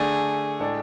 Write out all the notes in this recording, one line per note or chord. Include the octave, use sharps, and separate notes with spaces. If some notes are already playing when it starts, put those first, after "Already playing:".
Already playing: D3 A3 D4 G#4
A2 G#3 D4 A4